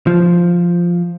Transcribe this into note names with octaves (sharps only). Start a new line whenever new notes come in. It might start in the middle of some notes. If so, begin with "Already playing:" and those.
F3